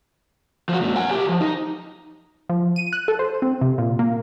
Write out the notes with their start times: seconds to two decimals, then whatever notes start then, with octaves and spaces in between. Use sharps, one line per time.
0.69 F3 F#4
0.81 F#2 A#2
0.96 F#5 G#5
1.08 B1 G4
1.29 F3
1.41 D#4
2.49 F3
2.76 D#7
2.93 F#6
3.08 A4
3.19 C5
3.42 C4
3.61 C3
3.78 A#2
3.99 A#3